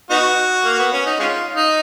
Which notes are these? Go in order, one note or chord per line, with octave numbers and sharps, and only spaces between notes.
B3 D#4 F#4
A#3
B3
C#4
D#4
G#3 C#4 F4
D#4